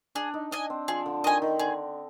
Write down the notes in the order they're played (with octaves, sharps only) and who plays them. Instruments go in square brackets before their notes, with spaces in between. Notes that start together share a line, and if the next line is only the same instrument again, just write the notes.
[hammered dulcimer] D4 [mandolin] G#4
[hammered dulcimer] D#4
[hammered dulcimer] D4 [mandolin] D#5 G#5
[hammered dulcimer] C4
[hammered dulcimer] F3 [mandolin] G#4
[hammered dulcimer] D3
[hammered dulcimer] D#3 [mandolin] D#5 G#5
[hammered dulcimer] D#3
[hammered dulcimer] D3 [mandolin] G#4